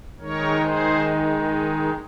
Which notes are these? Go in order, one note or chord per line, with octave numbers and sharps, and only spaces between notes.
D#3 G#3 D#4 A#4 C#5
G#4 C5